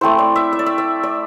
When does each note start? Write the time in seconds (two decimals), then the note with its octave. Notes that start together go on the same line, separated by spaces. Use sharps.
0.01 A3 C4 E4 C5
0.19 D5
0.36 E5
0.53 E5
0.59 D5
0.66 E5
0.78 E5
1.03 D5